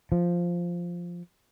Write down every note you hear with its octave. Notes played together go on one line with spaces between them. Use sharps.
F3